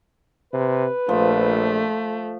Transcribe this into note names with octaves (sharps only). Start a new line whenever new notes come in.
C3 B4
A#1 F3 A3